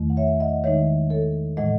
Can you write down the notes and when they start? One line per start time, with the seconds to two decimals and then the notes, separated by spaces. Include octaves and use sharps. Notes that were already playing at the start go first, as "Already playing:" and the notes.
Already playing: E2 D#3 A3
0.10 F#5
0.17 C#5 E5
0.40 D#5 F#5
0.64 D#3 G#3 D#4 C#5 E5
1.10 A4 C#5
1.57 A2 E3 G#3 D#5 F#5